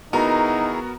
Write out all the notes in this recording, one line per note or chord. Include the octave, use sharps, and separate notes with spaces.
D#3 B3 D#4 E4 F#4 G#4 A#4 A#5